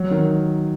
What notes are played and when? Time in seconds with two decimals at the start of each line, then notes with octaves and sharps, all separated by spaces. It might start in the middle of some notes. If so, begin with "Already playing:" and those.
Already playing: F#3
0.11 D#3